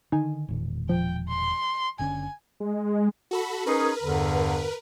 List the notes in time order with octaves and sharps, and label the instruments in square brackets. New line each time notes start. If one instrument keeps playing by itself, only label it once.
[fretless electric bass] D3 D#3 [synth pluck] D#4 G#5
[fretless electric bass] E1 A#2 D#3
[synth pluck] F3 [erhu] G5
[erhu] C6
[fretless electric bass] F#1 D3 C#4 [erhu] G#5
[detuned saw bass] G#3
[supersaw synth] F#4 A4 B5
[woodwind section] C#4 D#4 G#4 [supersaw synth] A#4 B4
[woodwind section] E2 G2 D3